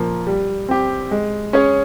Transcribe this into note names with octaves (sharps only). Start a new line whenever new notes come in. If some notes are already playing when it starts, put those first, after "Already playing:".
Already playing: A#2 F3 A#3
G3
C4 G4
G#3
C#4 G#4 C#5